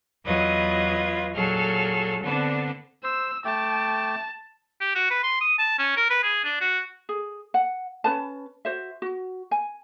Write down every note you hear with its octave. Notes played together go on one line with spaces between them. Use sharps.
E2 F#3 F4 B4 D#5 G#6
A#2 F#3 G#4 A4 F6
D3 B3 C4 D4 A5
C5 E6
A3 G5 A5 D6
G4
F#4
B4
C6
D#6
A5
C#4
A#4
B4
G#4
D4
F#4
G#4
F#5
C#4 B4 A5
F#4 C5 E5
F#4
G#5